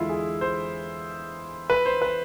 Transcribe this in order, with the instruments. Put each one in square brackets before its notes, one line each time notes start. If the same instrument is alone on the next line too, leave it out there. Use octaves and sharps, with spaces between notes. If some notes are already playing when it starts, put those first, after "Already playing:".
Already playing: [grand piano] E2 D3 G#3 E4 F4
G#4
C5
B4
C5
B4